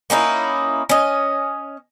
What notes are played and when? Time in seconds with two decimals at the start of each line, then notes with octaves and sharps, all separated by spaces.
0.10 A#3 C#4 D#4 E4
0.89 C#4 D#5